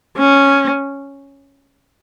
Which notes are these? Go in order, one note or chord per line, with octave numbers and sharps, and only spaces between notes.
C#4